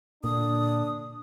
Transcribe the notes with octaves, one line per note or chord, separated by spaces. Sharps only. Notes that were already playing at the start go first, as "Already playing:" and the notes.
A#2 D3 D4 D#6